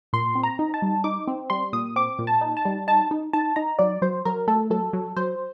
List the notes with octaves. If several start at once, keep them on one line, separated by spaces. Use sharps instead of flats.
A#2 C6
C4
A#5
D#4
A5
G3
D#4 D6
C4
G3 C6
A#2 D#6
C4 D6
A#2
A5
D#4
A5
G3
D#4 A5
D#4
D#4 A5
D#4 A#5
F#3 D5
F#3 C5
F#3 A#4
A3 A4
F#3 A4
F#3
F#3 C5